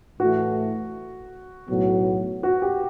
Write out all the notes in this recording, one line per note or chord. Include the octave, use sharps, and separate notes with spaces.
A2 E3 A3 F#4
B1 A2 F#3 B3 F#4
F#4
G4